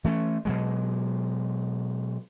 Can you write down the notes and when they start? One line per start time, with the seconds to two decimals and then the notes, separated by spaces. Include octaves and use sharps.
0.04 E3 A3 A#3 C#4
0.45 B2 F#3 G#3